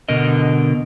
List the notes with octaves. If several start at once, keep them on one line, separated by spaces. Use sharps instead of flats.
B2 D3 A#4 D#5